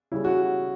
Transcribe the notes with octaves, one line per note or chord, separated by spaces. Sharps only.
C#3 G3 C#4 E4
F#4